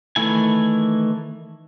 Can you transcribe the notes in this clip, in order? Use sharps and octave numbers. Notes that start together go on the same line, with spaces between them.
D#3 E3 A3 E4 G#5